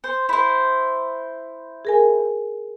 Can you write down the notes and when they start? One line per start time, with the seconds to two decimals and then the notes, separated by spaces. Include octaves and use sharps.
0.04 C5
0.29 E4 C5
1.85 G#4 A#4 G#5